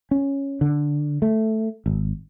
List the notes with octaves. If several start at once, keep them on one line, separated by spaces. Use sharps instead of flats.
C#4
D3
A3
G#1